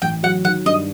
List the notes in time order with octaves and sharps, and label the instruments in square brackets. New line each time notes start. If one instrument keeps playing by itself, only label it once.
[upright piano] A1 [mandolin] G5
[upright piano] F#3 [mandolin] F#5
[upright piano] D#3 [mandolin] F#5
[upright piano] G2 [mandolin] D#5